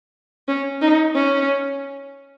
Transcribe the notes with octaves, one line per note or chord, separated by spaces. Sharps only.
C#4
D#4
C#4